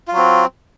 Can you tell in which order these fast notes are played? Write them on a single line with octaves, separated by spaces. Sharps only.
F4 F#3 C4